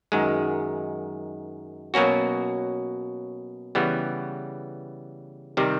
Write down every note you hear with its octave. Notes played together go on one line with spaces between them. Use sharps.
F#2 D#3 G#3
B2 F#3 A#3 C#4 F#4
C#3 E3 G3 B3
C3 D#3 G3 C4